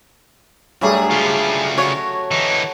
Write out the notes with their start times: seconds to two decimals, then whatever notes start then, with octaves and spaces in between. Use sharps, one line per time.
0.81 G2 F#3 G3 A3 G#4
1.10 C#3 F4
1.78 F#4 C#5
2.31 E3 D#4